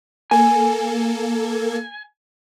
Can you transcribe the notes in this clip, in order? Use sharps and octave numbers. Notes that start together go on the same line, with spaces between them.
A#3 A4 G#5